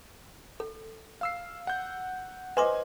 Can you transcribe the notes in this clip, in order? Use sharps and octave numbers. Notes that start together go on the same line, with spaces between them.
A4
F5 E6 C7
F#5 G6
B4 C5 D#5 G#5 C6 D6